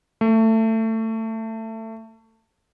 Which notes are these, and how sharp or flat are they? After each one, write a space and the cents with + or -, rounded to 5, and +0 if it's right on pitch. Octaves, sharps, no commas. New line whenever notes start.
A3 +20